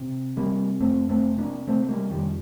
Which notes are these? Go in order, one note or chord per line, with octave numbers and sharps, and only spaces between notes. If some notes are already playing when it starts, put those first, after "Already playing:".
Already playing: C3
C3 G3 A#3
F2 A3 C4
A3 C4
C3
A#3 D4
C3 A3 C4
A3
G3 A#3
F2 D#3 G3